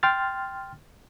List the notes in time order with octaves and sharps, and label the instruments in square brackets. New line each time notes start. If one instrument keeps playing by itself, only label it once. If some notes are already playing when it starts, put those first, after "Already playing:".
[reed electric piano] G5 C6 F6 A6